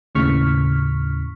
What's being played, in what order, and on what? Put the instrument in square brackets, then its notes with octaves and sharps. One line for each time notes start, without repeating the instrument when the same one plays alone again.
[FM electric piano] D#2 A2 C#3 C#6 F6 B6